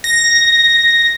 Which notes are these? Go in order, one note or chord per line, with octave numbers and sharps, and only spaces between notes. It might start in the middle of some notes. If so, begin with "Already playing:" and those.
A#6